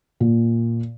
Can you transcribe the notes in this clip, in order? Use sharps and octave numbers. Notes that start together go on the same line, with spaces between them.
A#2